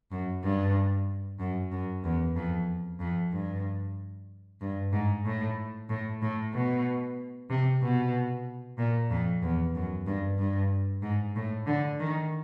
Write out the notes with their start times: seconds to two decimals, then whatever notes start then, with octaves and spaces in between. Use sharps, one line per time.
0.11 F#2
0.43 G2
1.39 F#2
1.71 F#2
2.04 E2
2.36 F2
3.00 F2
3.32 G2
4.61 G2
4.92 G#2
5.25 A2
5.89 A2
6.22 A2
6.54 B2
7.50 C3
7.82 B2
8.78 A#2
9.10 F2
9.42 E2
9.75 F#2
10.06 G2
10.39 G2
11.02 G#2
11.36 A2
11.66 D3
11.99 D#3